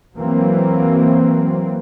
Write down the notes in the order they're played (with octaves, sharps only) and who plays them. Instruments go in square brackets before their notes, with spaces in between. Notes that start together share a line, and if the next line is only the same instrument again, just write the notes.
[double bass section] E3 F#3 A#3 C4